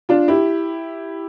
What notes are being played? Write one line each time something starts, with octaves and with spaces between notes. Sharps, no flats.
D4 F4
E4 G4